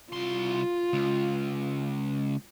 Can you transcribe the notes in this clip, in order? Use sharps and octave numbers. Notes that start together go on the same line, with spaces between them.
C2 F4 C6
C#2